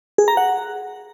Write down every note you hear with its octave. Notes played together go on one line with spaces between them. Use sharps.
G#4
A#5
F#5